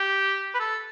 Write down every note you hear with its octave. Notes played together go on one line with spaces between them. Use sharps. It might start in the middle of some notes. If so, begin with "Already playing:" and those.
Already playing: G4
B4
A4